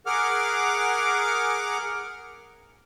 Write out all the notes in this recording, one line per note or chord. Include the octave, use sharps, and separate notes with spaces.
G#4 A#4 F#5 D6 F6